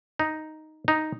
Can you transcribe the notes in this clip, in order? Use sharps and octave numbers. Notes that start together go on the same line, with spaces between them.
D#4
D#4